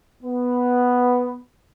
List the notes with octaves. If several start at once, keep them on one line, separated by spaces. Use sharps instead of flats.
B3